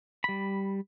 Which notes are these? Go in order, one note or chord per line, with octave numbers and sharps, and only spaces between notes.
G3 B5